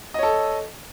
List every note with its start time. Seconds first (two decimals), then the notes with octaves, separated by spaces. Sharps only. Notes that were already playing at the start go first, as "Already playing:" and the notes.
0.14 D#5
0.19 C#5
0.23 A4